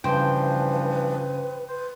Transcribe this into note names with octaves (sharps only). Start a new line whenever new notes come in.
G2 C#3 E3 F3 B4 C5 G5
B4 C5